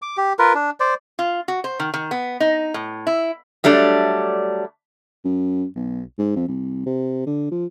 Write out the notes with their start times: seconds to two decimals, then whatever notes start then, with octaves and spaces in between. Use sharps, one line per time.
0.02 D6
0.17 G4
0.39 F4 A#4 B4
0.55 D4
0.80 C5 D5
1.19 F4
1.48 F#4
1.64 C5
1.80 D#3
1.94 D#3
2.11 B3
2.40 D#4
2.74 A2
3.07 E4
3.64 F#3 G3 A3 D4
5.25 F#2
5.76 B1
6.19 G#2
6.36 F2
6.48 C2
6.86 C3
7.26 D3
7.51 F3